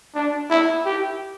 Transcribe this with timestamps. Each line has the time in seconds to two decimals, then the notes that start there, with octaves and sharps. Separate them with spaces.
0.15 D4
0.50 E4
0.85 G4